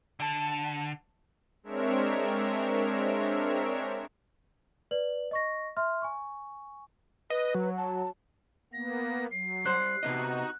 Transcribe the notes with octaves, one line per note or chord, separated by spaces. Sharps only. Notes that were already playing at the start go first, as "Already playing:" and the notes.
D3 A5
G#3 C4 D4 A#4 C#5 E5
B4 D5 F#7
D#5 C#6 A#6
E5 C6 F6
G#5 C#6
B4 D#5
F#3
A5
A#3 B3 A#6
F#3 C7
G3 C5 F#6
C3 B3 D#4 F#4 D#5